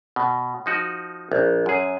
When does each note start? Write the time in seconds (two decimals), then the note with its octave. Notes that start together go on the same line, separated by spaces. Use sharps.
0.16 B2
0.66 F3 D#4 F#4
1.32 A#1
1.66 F#2 G#4